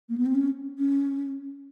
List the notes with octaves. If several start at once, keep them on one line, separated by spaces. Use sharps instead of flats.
A#3
B3
C4
C#4
C#4